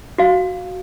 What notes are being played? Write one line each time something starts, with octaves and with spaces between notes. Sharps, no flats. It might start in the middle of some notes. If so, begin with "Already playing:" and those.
F#4 F5